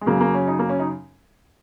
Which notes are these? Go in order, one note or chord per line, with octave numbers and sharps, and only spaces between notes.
G#3
F#2 C#3 F#3 A#3
A#3
C#4
D#4
A#3
C#4
D#4